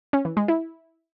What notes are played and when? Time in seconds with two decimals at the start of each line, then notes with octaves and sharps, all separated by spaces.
0.13 C#4
0.25 E3
0.37 G#3
0.48 E4